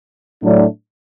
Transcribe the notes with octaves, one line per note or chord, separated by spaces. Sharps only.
A2 F#3 A3 D4